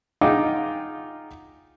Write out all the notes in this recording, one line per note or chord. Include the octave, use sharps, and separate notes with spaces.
D#4 F4 G#4 F#5 G5 D6